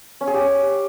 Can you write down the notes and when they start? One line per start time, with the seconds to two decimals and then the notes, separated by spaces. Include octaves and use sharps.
0.21 C#4
0.27 G#4
0.34 G4
0.41 C#4